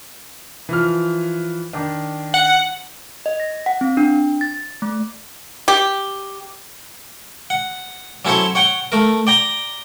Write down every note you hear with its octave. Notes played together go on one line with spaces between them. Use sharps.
E3 F3 F6
D#3 D4
F#5
D#5
A#6
F#5
C4
D4
A6
A3
G4
F#5
F#3 C#4 E4 A4 C5 C#5
C#5 F#5 G5
A3 A#4
D5 G5 A#5